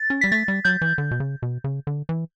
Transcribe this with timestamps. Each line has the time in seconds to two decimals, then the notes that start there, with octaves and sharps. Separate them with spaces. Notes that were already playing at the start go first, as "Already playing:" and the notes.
Already playing: A6
0.10 C#4
0.21 G3 B6
0.32 A3 A6
0.48 G3
0.65 F#3 G6
0.82 E3
0.98 D3
1.11 B2
1.20 C#3
1.42 B2
1.64 C#3
1.87 D3
2.09 E3